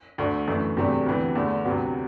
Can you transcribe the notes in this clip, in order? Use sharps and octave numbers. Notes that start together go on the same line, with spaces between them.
D2 D3 A3 D4
F#2 E3 A3 D4
E2 C3 F#3 A3 D4
D2 C3 E3 B3
E2 D3 A3
D2 C3 F#3 B3